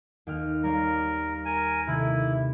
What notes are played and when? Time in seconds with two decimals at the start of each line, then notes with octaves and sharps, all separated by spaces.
0.27 D#2 G5 F6
0.63 G3 A#4 C#5 F5
1.45 A#4 G#5
1.87 C3 D#3 A3 E4